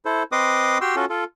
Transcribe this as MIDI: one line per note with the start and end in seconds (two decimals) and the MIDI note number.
0.05 0.23 64
0.05 0.23 69
0.05 0.23 72
0.32 0.78 60
0.32 0.78 71
0.32 0.78 75
0.32 0.78 84
0.32 0.78 86
0.32 0.78 87
0.81 0.96 66
0.81 0.96 67
0.81 0.96 79
0.81 0.96 84
0.81 0.96 88
0.96 1.05 61
0.96 1.05 65
0.96 1.05 66
0.96 1.05 69
1.10 1.24 65
1.10 1.24 69